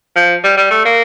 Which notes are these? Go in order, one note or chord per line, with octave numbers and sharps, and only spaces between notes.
F3
G3
G3
A3
A#3